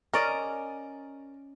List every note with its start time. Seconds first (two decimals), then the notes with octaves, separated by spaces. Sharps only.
0.14 C#4 A#4 D5 D#5